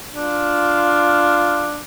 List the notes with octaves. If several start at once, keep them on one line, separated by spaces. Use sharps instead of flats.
D4 F4